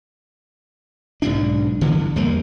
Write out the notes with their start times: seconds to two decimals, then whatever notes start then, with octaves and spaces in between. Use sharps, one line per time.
1.22 B1 G#2 B2 D4
1.81 G1 D3 E3 B3
2.16 E2 G3 G#3 A#3